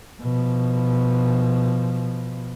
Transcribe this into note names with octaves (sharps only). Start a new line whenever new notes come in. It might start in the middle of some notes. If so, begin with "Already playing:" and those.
B2 F3